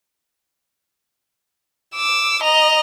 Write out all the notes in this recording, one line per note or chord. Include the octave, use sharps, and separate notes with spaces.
D6 E6
D#5 A#5